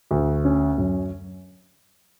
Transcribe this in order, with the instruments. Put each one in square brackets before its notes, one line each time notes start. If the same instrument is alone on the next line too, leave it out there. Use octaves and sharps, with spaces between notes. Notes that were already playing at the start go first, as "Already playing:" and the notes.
[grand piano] D2
C#4
F#2